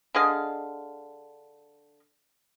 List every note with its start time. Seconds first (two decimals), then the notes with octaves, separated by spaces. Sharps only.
0.15 D3 G#4 D#5 F5